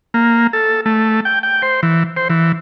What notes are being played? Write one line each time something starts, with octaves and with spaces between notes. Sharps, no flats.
A#3
A4
A3
G5
G5
C5
E3
C5
E3